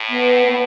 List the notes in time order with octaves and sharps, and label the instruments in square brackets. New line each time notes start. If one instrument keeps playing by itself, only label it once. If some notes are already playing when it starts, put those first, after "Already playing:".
Already playing: [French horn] A2
[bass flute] B3
B3